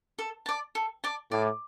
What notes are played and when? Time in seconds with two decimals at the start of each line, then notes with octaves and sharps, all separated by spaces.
0.19 A4
0.46 D5 A5
0.75 A4
1.04 D5 A5
1.31 A2 D5